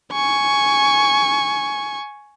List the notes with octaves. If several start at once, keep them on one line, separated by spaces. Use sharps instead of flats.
G#5 C#6